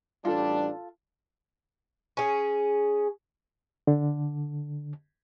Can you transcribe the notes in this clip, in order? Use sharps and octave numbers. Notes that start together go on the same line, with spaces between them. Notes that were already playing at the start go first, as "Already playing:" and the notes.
A1 G3 D4 F4 A4
C#4 G#4
D3